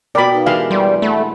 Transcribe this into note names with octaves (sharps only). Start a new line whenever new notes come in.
B2 A#4 D5 G5 B5
D#4 B4 F5
E3 G#3 D4 G4 A#4 F5
G3 B4 D5 C6
A3 F#5 B5